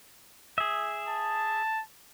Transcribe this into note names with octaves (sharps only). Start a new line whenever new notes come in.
G#4 E5
A5